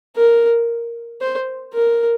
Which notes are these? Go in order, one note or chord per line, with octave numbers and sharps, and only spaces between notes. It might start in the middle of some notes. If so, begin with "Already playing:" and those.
A#4
C5
A#4